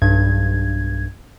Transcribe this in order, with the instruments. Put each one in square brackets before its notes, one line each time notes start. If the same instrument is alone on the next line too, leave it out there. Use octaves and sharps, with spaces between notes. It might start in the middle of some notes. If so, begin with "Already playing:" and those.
[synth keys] B1 G2 G#6